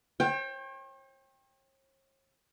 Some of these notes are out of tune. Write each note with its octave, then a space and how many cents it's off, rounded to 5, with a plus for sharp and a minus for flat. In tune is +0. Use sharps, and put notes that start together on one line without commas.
C#5 -45 G5 +15